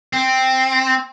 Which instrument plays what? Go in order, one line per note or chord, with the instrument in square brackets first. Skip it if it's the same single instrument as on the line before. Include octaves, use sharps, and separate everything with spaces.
[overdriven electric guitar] C4